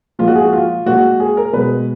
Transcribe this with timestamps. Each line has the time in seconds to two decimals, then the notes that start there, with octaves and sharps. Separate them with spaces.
0.19 A#2 F3 G#3 F4
0.28 F#4
0.36 G#4
0.44 F#4
0.53 F4
0.86 A#2 G#3 F#4
1.20 G#4
1.37 A#4
1.53 B2 G#3 B4